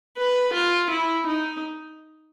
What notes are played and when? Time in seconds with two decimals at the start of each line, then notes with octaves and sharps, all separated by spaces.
0.18 B4
0.54 F4
0.91 E4
1.27 D#4